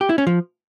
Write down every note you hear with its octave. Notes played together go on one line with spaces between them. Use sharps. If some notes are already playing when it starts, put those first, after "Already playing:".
G4
E4
C#4
F3